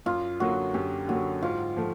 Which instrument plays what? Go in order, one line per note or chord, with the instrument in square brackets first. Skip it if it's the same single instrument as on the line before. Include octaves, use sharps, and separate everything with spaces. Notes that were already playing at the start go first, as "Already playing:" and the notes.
[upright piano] F#2 [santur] F4
[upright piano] D3 F#3 A#3 [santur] F#4
[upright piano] F#2 [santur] G4
[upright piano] D3 F#3 A#3 [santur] F#4
[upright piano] G#2 [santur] F4
[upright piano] F3 A3